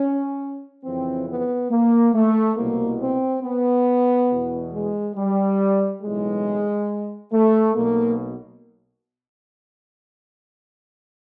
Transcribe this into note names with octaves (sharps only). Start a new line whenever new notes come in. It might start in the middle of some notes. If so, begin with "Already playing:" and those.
Already playing: C#4
F2 C#3 E3 C4
B3
A#3
A3
C2 B2 A#3
C4
B3
E2 B2
G#3
G3
B1 A2 E3 G#3
A3
B1 B2 A#3